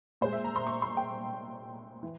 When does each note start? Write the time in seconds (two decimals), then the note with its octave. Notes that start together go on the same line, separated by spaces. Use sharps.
0.21 A#2 C5
0.25 G#3
0.33 E5
0.44 A#5
0.56 C6
0.67 C#6
0.82 C6
0.97 G5
2.03 E3